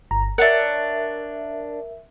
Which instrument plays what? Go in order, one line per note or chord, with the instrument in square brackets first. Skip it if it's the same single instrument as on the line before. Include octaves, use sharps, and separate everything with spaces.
[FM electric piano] G1 A#5
[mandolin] D4 C#5 F#5 [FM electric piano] A#4 E5